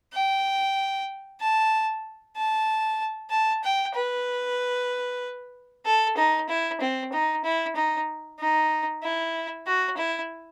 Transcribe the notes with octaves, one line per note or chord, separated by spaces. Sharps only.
G5
A5
A5
A5
G5
B4
A4
D#4
E4
C4
D#4
E4
D#4
D#4
E4
F#4
E4